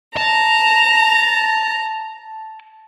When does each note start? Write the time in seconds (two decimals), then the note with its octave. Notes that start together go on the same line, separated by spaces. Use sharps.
0.17 A5 A#5